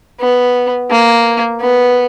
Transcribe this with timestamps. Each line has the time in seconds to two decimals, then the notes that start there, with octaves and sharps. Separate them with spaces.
0.20 B3
0.90 A#3
1.60 B3